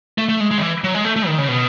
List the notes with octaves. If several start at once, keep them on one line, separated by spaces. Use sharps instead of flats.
A3
A3
G#3
G#3
D#3
E3
F#3
G#3
A3
A3
D#3
C#3
B2